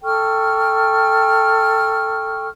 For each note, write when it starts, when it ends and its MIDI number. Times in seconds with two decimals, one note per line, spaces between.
0.04 2.48 69
0.04 2.48 79
0.04 2.48 85
0.04 2.48 89